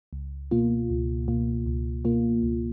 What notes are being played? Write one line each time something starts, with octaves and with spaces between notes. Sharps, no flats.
C#2
B2 A#3 F4
C#2
B2 A#3 F4
C#2
B2 A#3 F4
C#2